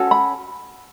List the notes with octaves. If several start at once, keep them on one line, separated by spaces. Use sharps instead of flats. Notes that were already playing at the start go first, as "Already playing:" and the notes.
Already playing: C#4 F#4 A4
B5